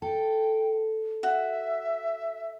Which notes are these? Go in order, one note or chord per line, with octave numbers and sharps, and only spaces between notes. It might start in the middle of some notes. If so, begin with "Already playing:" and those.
A4 G5
F#4 E5